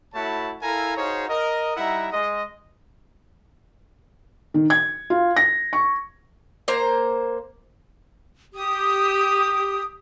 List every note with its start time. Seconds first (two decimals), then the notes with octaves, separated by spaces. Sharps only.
0.14 A3 E4 F#4 C#5 A5 B5
0.62 E4 A4 A#4 F5 G#5 A#5
0.97 D#4 F#4 G#4 C5 C#5 F5
1.29 A#4 D#5
1.77 G3 D#4 E4 E5 F#5 A#5
2.12 G#3 D#5
4.54 D#3
4.70 G#6
5.10 F4
5.36 A#6
5.73 C#6
6.68 A#3 C5 A#5
8.54 G4 D#6